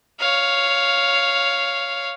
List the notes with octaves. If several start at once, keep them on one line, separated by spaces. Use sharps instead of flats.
C#5 F5